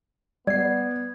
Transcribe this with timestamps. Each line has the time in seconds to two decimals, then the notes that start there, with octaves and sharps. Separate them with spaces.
0.47 G3 B3 D5 G#6 C7